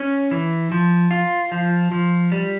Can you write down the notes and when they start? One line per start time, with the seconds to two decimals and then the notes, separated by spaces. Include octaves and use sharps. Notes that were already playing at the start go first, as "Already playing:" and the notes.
Already playing: C#4
0.31 E3
0.72 F3
1.11 F4
1.52 F3
1.92 F3
2.32 G3